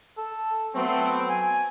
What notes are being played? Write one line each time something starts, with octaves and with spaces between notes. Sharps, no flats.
A4
F#3 A3 B3 C4
G#5